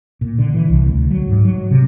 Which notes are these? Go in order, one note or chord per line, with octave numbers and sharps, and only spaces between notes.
A#2
D3
E3
C2
D2
F#3
G#2
F#3
C3